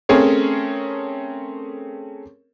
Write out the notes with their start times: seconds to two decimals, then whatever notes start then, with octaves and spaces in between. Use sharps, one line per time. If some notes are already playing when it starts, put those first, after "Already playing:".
0.09 A3 C4 C#4 G#4 A#4 C#5